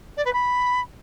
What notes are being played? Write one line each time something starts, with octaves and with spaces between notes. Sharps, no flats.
D5
B4
B5